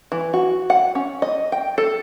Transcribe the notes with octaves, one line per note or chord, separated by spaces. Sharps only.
E3
F#4
F#5
C#4
D#5
G5
A4